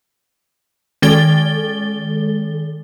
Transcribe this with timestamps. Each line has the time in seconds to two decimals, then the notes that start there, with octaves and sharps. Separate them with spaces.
1.02 D#3 G#3 A4 A6 G7